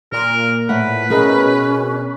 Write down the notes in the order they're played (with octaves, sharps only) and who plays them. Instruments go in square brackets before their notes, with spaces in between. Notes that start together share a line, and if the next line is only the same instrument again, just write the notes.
[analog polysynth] A#2 [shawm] A#4
[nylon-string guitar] A2 A3 F#5 [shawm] B4
[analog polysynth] B2 [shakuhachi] C#4 [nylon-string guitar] G#4 A#4 D#5